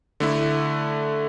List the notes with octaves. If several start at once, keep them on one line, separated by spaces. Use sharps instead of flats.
D3 A3 E4